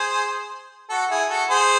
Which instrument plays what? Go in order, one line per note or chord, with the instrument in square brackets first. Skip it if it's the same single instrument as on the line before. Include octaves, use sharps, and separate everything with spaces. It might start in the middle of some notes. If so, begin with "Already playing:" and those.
Already playing: [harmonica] G#4 C5
F#4 A4
E4 G#4
F#4 A4
G#4 C5